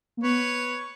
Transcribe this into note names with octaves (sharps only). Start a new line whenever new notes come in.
A#3
B3 B4 C#5